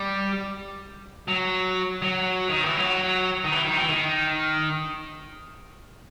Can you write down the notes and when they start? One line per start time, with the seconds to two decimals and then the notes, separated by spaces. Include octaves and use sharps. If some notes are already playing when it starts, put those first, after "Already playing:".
Already playing: G3
1.28 F#3
2.02 F#3
2.50 D#3
2.63 E3
2.77 F#3
3.44 D#3
3.52 E3
3.65 D#3
3.77 E3
3.89 D#3